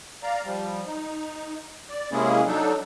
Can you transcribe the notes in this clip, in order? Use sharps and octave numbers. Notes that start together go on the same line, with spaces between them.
D5 F5 A#5
F3 G3
D#4
D5
C3 G#3 A#3 C#4 E4 G#4
F#3 D4 D#4 A4